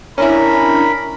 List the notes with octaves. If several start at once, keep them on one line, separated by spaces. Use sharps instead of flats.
C#4 D4 E4 A#4 B5